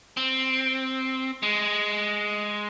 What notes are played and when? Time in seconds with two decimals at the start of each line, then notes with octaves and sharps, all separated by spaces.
0.17 C4
1.43 G#3